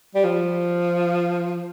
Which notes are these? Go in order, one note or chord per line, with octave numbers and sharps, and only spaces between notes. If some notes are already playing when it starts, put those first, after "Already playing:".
G3
F3